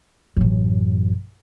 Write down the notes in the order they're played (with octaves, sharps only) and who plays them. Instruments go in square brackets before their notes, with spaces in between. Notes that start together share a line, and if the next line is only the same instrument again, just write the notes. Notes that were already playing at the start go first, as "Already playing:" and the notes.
[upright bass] A1 F#2